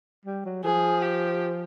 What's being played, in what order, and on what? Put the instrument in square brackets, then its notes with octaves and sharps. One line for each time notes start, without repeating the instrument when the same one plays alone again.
[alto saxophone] G3
F#3
[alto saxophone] F3 [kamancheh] G#4
[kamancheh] G4